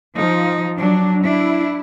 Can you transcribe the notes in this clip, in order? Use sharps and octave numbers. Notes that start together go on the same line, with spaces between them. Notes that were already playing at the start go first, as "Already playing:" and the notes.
F3 D#4
F#3 D4
D4 E4